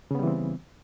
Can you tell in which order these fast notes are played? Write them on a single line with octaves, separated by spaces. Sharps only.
C#3 B3 G3 E3 C4